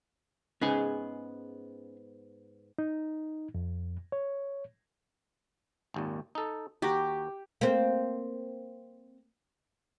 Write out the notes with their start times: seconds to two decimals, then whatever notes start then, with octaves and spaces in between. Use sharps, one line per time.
0.61 G#2 B3 C#4 G#4 G#5
2.78 D#4
3.54 F2
4.12 C#5
5.94 G#1 D#2 A#2
6.35 D#4 A4
6.82 D#2 F#4 G4 A#5
7.61 A#3 C4